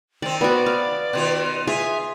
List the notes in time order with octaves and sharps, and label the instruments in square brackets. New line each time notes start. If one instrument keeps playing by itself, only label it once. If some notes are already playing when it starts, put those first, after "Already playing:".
[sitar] D#3 C4 [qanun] D5
[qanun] B3 F#4 [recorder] D5
[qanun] F5
[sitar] B2 D#3 F4
[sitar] F4 [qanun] G#4 [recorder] E5